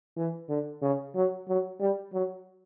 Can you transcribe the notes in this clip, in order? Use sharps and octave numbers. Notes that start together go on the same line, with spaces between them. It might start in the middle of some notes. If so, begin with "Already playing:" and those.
E3
D3
C#3
F#3
F#3
G3
F#3